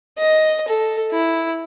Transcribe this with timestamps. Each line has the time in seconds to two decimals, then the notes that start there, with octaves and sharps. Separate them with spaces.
0.18 D#5
0.68 A4
1.11 E4